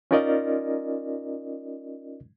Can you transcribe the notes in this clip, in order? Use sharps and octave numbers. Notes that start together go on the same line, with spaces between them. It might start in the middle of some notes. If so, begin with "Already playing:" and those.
C#4 D#4 F4 A#4 D5 D#5